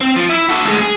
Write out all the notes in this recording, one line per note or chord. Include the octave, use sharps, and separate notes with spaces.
C4
F3
E4
F#4 A4
D2 G#3
G#4